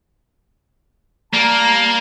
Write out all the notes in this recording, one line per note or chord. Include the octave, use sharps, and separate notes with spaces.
G3 A#3 A5 A#5